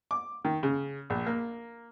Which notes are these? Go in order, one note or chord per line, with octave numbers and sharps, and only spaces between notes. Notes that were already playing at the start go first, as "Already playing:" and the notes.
D6
D#3
C#3
A#1
A#3